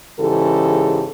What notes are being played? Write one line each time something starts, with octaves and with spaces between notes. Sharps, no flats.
G#2 C#3 E3 G4 A4